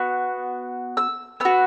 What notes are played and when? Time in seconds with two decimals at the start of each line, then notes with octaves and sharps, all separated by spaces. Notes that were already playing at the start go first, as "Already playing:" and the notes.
Already playing: B3 F#4
0.97 E6
1.40 B3 F#4 E6